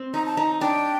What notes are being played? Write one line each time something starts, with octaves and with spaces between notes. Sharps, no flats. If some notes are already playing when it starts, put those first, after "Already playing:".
Already playing: C4
D#4 A#5
A5
D#4 A#5
D4 G5